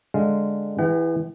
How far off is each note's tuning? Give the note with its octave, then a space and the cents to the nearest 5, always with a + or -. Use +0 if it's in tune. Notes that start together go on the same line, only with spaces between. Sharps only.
D3 +0 G#3 +0 F5 -10
E3 +0 G#4 -45 F#5 +45